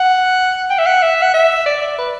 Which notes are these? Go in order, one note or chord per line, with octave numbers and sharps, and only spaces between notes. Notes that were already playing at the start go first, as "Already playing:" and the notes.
Already playing: F#5
G5
E5
F#5
E5
F#5
E5
D5
D5
B4